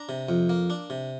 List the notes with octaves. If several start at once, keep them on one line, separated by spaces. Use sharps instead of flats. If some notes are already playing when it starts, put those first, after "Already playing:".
Already playing: D4 A#5
C3
F2
A#3
D4
C3